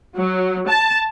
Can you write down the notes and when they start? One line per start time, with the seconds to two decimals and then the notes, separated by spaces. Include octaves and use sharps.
0.18 F#3
0.69 A5